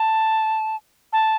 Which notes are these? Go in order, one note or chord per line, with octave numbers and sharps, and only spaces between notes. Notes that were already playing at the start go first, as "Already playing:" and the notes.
Already playing: A5
A5